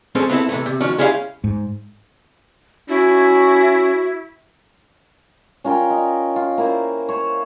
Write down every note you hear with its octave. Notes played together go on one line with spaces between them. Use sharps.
G#3 C4 C#4 A4 C5
B3 C4 E4 A4
C3 E3 A3
C3
D#3 F3 C#4 F#4
G#3 C#4 E4 G4 C#5 F5
G#2
C#4 E4 F#4
C#4 F4 A#4 G5
D#5
F4
A#3 E4 C5
C5 C#5